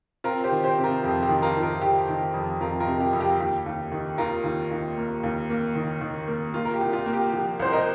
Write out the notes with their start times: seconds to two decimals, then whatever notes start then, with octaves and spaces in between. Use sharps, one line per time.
0.24 C4 F4 A#4
0.44 G4 C5
0.51 D#3
0.64 G4 C5
0.78 C3
0.84 F4 A#4
1.03 F2 G4
1.23 G4
1.29 D#3
1.42 F4 A#4
1.56 D#3
1.62 F4 A#4
1.82 D#3 G4
2.08 D#3
2.34 F2
2.60 F2 F4 A#4
2.80 F4 A#4
2.87 C3
3.00 G4
3.13 F2
3.20 G4
3.40 D#2 G4
3.66 D#2
3.92 D#3
4.18 D#2 F4 A#4
4.44 D#2
4.71 D#2
4.97 A#3
5.23 D#2
5.50 A#3
5.75 D#3
6.01 D#3
6.28 A#3
6.54 A#3 F4
6.65 A#4
6.74 G4
6.81 C2
6.93 F4
7.06 A#3
7.13 G4
7.33 F3 G4
7.60 C2 C5
7.72 A#4 D#5